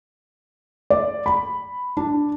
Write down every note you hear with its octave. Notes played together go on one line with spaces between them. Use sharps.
D5
B5
D4